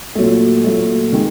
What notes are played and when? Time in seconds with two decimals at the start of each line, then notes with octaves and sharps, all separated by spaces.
0.15 A#2 F#3 A3
0.64 A#2 F#3 A3
1.13 D#3 G#3